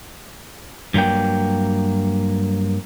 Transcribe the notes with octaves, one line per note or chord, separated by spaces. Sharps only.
G2 F#3 A#3 G5